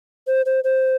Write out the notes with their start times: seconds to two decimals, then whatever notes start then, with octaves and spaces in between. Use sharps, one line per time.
0.27 C5
0.46 C5
0.64 C5